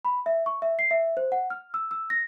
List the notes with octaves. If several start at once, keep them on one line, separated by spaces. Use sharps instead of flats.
B5
E5
C#6
E5
C7
E5
C5
F#5
F6
E6
E6
A#6